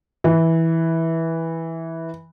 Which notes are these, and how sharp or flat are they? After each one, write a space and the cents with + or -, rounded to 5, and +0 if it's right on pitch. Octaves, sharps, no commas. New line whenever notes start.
E3 -10